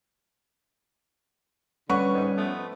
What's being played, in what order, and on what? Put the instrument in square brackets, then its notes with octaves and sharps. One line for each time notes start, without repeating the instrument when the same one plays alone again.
[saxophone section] D3 [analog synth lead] G3 [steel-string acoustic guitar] C#4 [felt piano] B4 F#5 C#6
[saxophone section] G#2
F3 A3 B3